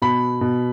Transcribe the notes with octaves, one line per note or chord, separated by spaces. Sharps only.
B2 B5
B2